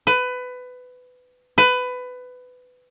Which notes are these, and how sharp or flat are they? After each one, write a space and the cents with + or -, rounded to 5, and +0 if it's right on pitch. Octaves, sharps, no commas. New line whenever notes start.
B4 +20
B4 +20